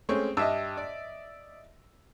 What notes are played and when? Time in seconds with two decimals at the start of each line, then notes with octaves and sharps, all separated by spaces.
0.09 G#3 A3 C4 C#4 C#6
0.37 G2 D#5 E5 E6
0.77 D5